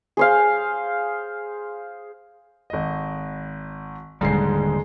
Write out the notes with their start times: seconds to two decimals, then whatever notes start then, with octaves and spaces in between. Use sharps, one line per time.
0.17 G#4 C5 F5
2.70 G#1 D#5
4.21 D#1 G#2 D3 G3 G#3 C7